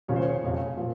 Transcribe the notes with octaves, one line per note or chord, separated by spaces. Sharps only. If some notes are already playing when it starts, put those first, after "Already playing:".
D#2 C#3 F3 C#5
C5
C#5
F1 F2 C#3 F3
A#2 F3